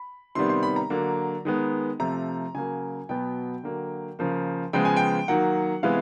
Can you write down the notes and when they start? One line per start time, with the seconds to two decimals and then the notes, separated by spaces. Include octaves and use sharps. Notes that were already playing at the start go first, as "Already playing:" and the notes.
Already playing: B5
0.35 C3 D#3 G3 B3 C6
0.49 C6
0.63 B5
0.76 A#5
0.90 D3 F#3 A#3
1.45 D#3 G#3 B3
2.00 C3 F3 A3 A#5
2.55 C#3 F#3 A#3 G#5
3.09 B2 F#3 B3 G5
3.63 D3 F#3 A#3
4.19 C#3 F3 A#3
4.73 C#3 F3 G#3 B3 G5
4.85 G#5
4.96 G5
5.28 D#3 F#3 A#3 F#5
5.83 C3 E3 G#3 B3 F5